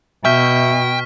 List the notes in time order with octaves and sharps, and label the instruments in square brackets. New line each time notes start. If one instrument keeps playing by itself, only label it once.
[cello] B2 [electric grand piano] E5 G6 [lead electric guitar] G5 [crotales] C#6 F6 B6